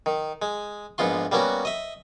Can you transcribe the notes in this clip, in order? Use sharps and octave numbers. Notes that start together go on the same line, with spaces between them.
D#3
G#3
A#1 G#2 B3 F4 C6
G3 A#3 B3 C#4 F#4
D#5 E5